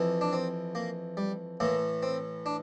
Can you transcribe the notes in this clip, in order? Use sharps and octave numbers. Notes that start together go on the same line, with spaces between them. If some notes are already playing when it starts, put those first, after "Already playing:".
Already playing: F2 E3
D4
C4
A#3
G3
A2 E3 A#3
C4
D4